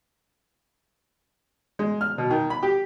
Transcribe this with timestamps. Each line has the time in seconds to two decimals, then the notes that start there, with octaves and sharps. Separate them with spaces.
1.79 G#3
2.01 F6
2.18 B2
2.30 D#3
2.50 B5
2.63 G4